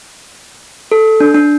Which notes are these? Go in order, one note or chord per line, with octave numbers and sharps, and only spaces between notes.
A4
D4
D4